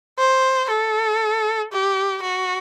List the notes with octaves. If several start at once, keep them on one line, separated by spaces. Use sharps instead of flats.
C5
A4
G4
F#4